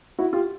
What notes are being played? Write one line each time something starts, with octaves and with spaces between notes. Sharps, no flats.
E4 F#4
F4 G4